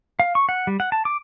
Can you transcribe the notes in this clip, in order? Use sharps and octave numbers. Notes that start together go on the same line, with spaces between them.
F5
C#6
F#5
G3
F#5
A5
D6